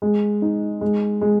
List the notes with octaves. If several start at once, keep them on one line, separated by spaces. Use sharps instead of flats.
G#3
D#4
G#3
G#3